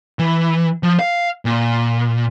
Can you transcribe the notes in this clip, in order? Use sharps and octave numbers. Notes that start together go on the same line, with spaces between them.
E3
F3
F5
A#2